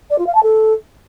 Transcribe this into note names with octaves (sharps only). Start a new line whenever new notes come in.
D5
F4
F5
A5
A4